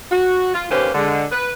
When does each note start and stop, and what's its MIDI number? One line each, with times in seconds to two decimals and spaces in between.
0.11 0.52 66
0.54 0.64 65
0.70 0.89 39
0.70 0.89 58
0.70 0.89 61
0.70 0.89 67
0.70 0.89 71
0.70 0.89 72
0.94 1.25 50
0.94 1.25 56
1.32 1.52 71